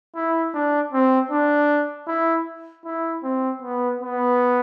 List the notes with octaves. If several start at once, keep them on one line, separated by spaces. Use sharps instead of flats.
E4
D4
C4
D4
E4
E4
C4
B3
B3